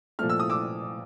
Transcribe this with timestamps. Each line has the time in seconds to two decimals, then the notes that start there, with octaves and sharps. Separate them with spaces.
0.19 A#2 F3 A3 F6
0.29 E6
0.40 D#6
0.50 D6 E6